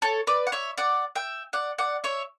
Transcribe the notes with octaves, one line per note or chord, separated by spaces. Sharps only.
A4 C#5
B4 D5
F#5
C#5 E5
D5 F#5
E5 G5
D5 F#5
D5 F#5
C#5 E5